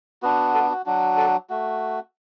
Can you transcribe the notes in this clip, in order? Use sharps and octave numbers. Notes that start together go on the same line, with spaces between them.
B3 D4 F#4
A4
F#4
F#3 D4 F#4
A4
A3 F#4